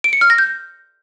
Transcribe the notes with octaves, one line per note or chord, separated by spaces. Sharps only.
D7
C#7
F6
A#6
G6